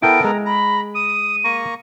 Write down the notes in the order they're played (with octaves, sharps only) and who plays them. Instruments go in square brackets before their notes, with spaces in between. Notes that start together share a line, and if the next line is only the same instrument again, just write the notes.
[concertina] B3 A4 A#4 [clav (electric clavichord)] E4 G5 [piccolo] D7
[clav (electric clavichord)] G#3 [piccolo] A#5
[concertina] A#5 [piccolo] B5
[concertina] D#6 [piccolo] D#7
[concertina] A#3 A#5 C#6